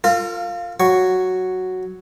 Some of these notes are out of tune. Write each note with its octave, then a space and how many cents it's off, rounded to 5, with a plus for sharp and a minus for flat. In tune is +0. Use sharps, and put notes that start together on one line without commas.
F4 +0 A#4 -45
F#3 +0 C#6 +0